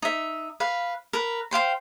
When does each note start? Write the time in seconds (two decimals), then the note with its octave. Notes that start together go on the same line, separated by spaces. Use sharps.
0.02 D#4 E5
0.60 B4 F5
1.13 A#4 B4
1.51 C5 F5 G5 C6